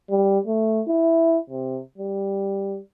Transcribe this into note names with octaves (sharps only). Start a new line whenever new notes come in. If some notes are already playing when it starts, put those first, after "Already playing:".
G3
A3
E4
C3
G3